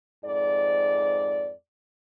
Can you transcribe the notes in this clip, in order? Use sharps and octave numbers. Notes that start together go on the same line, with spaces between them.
F2 G#2 D5